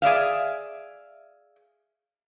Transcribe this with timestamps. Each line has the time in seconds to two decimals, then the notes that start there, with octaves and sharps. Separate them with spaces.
0.02 G#4 D5 E5 F5